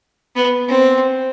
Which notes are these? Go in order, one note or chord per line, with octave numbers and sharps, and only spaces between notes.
B3
C4